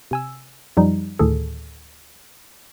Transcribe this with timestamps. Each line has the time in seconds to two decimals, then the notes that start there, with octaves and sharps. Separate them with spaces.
0.11 C3 G#5 E6
0.77 F#2 F3 G3 D#4
1.19 D2 A2 D#3 G#4 A4